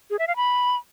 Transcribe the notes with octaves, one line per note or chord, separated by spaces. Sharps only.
G#4
E5
F5
B5